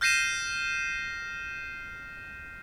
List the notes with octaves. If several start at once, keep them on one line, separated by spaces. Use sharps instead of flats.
F6 G6 A#6 C7 D#7 E7